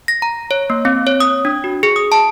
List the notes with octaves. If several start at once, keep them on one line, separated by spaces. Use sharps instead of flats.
A#6
A#5
C#5
A#3
C4
C#5
D#6
D4
F#4
G#4
D#6
A5